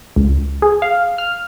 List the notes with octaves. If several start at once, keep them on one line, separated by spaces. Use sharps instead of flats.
C#2
G#4
F5
F6